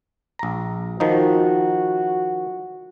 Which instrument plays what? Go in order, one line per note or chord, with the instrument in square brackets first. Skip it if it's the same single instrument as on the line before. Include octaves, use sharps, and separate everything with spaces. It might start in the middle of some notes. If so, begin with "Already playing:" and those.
[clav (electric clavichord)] A#1 A#5
[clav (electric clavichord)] D#3 F3 D#4 [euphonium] F#4